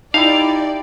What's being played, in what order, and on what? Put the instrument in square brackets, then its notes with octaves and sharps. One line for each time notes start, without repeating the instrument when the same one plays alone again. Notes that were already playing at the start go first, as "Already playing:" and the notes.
[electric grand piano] D#4 [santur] E4 G4 A5 [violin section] D5 [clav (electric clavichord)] F5